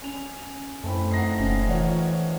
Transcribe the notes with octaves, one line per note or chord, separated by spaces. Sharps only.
C#4 F7
F#2 A3 C4 E4
D#4 F#5 A#6 C7
F1 A#2 C#4
E3 F4 C#5 F#5